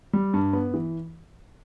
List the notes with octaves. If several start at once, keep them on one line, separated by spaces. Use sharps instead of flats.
G3
G2
B3
E3